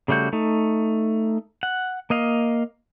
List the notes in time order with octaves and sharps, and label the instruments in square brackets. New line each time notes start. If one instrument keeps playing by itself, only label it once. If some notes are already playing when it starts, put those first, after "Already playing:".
[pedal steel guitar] C#3 G3 A3 F#4 G6
A3 D#4
F#5
A#3 D#5 F5